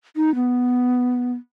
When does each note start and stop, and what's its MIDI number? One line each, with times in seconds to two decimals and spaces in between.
0.16 0.33 63
0.35 1.33 59